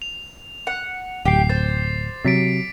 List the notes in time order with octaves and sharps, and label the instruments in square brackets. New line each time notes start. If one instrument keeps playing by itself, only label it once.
[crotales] F7
[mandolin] F#5
[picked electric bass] D1 [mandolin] G4 [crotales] D6 C7
[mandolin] C5 [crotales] A6
[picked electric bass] C3 F#3 [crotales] A6 B6 D7